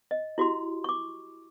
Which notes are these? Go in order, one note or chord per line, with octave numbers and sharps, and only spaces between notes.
D#5
E4 F#4 G4 C6
C#6 D6